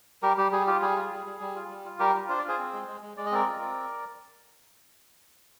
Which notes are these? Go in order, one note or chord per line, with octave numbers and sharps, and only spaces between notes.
G3 G4 A#4
G3 G4
G3 G#4
F4 G4
G3 G#4
F4
G3
G3
G3
F4
G3
F4
G3 G4 A#4
F4
D4 C5
D5
F4 G#4 C5
C4
G#3
G#3
G#3
G#3 D5
D#5
C4 A#4 D5
F4
C4